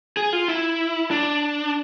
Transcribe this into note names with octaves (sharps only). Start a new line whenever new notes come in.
G#4
F4
E4
D4